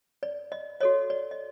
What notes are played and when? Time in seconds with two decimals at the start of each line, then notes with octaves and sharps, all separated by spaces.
0.23 D5
0.52 D#5
0.80 F#4 A4 C#5 D#5
1.10 D5
1.31 D#5